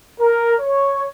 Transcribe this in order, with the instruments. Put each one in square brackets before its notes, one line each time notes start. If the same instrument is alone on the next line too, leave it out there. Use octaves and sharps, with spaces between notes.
[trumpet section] A#4
C#5